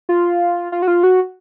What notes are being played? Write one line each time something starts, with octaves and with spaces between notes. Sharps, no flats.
F4
F4
F#4
F4
F#4